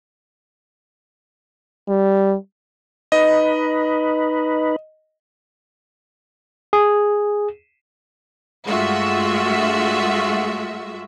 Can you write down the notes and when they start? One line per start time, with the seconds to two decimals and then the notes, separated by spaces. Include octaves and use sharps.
1.88 G3
3.12 D#4 B4 D#5
6.73 G#4
8.65 G2 G#3 A3 F4 F#4 E5